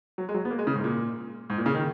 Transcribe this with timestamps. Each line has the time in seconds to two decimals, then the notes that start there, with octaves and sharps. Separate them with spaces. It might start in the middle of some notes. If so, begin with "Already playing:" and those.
0.18 F#3
0.29 G#3
0.34 F#3
0.45 B3
0.51 A#3
0.59 G#3
0.67 C#3
0.75 G#2
0.84 A#2
1.50 G#2
1.58 A#2
1.66 C#3
1.74 D#3